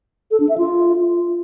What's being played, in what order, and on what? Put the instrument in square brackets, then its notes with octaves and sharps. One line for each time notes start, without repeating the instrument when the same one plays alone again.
[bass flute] A4
D4
E5
F4